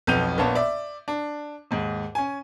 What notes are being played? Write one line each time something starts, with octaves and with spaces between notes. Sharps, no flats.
B1 F2 B3 G6 D#7 F7
A#1 A#3 B3 C#5 A5
D5 E5
D4
D#2 G#2
C#4 G#5